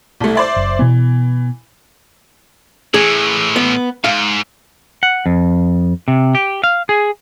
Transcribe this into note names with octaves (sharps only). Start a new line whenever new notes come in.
C2 A3
C5 D5 E5
F#1
B2 E3 B3
A2 E3 G#4
B3
G#2 F5
F#5
F2
C3
G4
F5
G#4